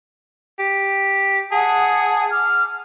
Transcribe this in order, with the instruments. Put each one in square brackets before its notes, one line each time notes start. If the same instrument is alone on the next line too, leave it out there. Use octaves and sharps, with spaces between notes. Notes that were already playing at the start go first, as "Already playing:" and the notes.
[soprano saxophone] G4
[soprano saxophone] G#4 [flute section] F#5 A5 D#6
[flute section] D6 F6